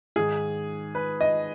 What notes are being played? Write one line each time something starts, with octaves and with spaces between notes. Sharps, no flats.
G#2 D#3 G#4
B4
D#5